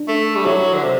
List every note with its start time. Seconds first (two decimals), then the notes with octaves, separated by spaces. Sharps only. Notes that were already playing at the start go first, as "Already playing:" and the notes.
Already playing: D4
0.08 A3
0.35 G3
0.45 F#3 E4 A4 E5
0.74 D3
0.83 C3